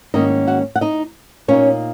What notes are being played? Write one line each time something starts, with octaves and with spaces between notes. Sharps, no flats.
G#2 D#3 A#3 C#4 D#4 D#5
F#4 F#5
F#5
D#4 D#5
A#2 A#3 C#4 D#4 C#5